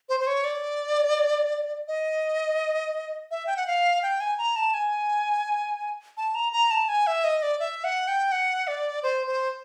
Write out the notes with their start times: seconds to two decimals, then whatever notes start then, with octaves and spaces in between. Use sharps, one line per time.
0.09 C5
0.20 C5
0.27 C#5
0.45 D5
1.88 D#5
3.31 E5
3.47 G5
3.57 F#5
3.67 F5
4.03 G5
4.20 G#5
4.38 A#5
4.56 A5
4.74 G#5
6.17 A5
6.35 A#5
6.53 A#5
6.71 A5
6.89 G#5
7.07 E5
7.24 D#5
7.42 D5
7.60 E5
7.84 F#5
8.08 G5
8.32 F#5
8.67 D5
9.03 C5
9.27 C5